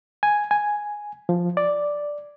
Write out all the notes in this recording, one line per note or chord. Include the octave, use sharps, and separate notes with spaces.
G#5
G#5
F3
D5